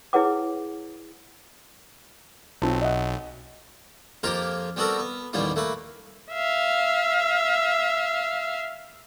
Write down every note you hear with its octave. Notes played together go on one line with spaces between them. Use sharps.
E4 G#4 B4 C#5 F#5 D6
B1 C4 F4 A5
D#5 E5 F#5
F2 A#3 F4 G4 A#4
G3 B3 C4 F#4 A4 A#4
B3
A1 D#2 A#2 G3 A#3 B3
A3 A#3 B4
E5 F5